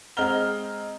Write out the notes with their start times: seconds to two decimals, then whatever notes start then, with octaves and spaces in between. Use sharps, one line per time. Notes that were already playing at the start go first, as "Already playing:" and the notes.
0.17 G#3 C4 D#5 A#5 F6 G7